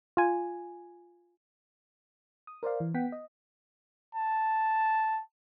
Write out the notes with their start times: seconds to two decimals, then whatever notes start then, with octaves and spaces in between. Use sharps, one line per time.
0.17 F4 G#5
2.47 D#6
2.63 A#4 C5 D5 F5
2.80 E3
2.94 B3 F#5 G5 B6
3.12 D#5
4.15 A5